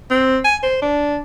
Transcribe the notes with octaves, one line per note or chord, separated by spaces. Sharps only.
C4
G#5
C5
D4